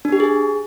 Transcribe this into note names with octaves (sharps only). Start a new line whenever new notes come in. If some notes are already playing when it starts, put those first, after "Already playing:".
D4
G4
G#4